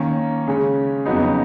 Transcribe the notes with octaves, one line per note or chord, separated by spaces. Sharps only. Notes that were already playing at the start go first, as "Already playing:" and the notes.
Already playing: D#3 A#3 C#4
C#3 G#3 C#4
F2 C#3 F#3 B3 D#4